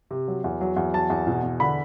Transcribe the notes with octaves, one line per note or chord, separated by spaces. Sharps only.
C3
F#3
E2
F#3
E2
F#3 A5
E2
B2
E2
D3 B5